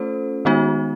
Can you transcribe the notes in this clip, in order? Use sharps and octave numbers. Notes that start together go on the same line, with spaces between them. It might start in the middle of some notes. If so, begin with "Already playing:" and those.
Already playing: A3 C#4 F4 A4 C5
D#3 G#3 B3 D#4 F#4